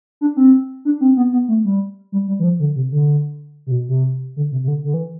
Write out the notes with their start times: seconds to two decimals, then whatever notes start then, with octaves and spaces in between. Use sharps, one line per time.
0.21 D4
0.37 C4
0.85 D4
1.01 C4
1.17 B3
1.33 B3
1.48 A3
1.65 G3
2.12 G3
2.28 G3
2.40 E3
2.44 F3
2.60 D3
2.76 C3
2.92 D3
3.67 C3
3.72 B2
3.89 C3
4.36 D3
4.52 C3
4.64 C3
4.68 D3
4.85 D3
4.94 E3